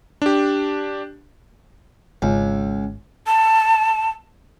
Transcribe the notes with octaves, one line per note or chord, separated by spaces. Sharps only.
D4 G4
G#1 C#2
A5